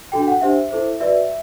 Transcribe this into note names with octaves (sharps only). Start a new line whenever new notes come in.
D4 F#4 A4 G5
F#5
D4 G4 C5 E5
E4 A4 C5
F#4 B4 D5 E5